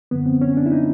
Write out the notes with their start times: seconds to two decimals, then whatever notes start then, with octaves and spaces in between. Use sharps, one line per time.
0.11 F#2 D3 F3 B3
0.26 C4
0.41 C#4
0.57 D4
0.66 E4
0.72 D#4